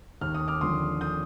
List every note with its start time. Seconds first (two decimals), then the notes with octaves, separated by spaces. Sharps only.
0.21 D#2 F6
0.35 D#6
0.48 D6 F6
0.61 D3 F3 C6 D#6
1.01 D#6 G6